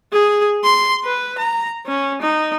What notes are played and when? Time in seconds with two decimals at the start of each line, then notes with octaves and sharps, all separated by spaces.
0.12 G#4
0.64 C6
1.04 B4
1.38 A#5
1.86 C#4
2.21 D#4